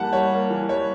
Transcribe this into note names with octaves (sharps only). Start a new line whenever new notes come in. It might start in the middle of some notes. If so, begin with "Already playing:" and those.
Already playing: E3 G3 A#3 F#5 A5
G3 C#5
A#3
E3
G3 C#5